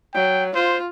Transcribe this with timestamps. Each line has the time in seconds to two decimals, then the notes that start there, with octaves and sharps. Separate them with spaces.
0.14 F#3 G5
0.55 F4 C5